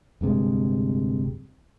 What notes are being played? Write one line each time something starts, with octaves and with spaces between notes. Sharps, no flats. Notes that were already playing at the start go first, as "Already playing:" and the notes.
D1 G2 C3 G#3